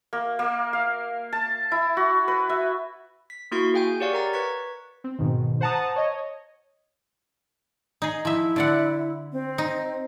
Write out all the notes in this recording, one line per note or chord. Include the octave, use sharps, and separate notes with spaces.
A#3
A#3
F5
A5
E4
F#4
B4
E5
B6
A#3 E4 F#4 C6 C#6 B6
G#4 F5 G5 G#5 G6
G4 C#5 D5 F5 F#5 C#6
A#4 A#5 A6
B4 C#6 G#6 B6
C4
G#2 B2 D#3
C5 F#5 A5 A#5 D#6
C#5 D#5
D#4 G#4
F3 E4 E5
D3 D5 F#5
C4
D#4